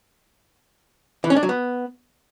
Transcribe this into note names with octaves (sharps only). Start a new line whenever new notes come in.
E3
C#4
D4
F#3
B3